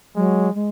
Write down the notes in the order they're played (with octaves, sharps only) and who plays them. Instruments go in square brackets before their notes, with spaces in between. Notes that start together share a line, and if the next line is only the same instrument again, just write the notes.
[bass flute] F#3 [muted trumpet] G#3
[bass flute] G#3